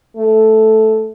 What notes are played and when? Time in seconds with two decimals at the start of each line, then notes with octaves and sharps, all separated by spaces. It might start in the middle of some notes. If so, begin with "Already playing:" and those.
0.17 A3